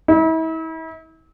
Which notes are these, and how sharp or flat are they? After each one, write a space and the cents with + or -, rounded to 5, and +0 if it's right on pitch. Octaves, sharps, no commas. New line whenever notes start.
E4 -40